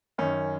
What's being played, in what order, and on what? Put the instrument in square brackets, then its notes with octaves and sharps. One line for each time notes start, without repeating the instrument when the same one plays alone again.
[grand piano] F#2 D#3 C#4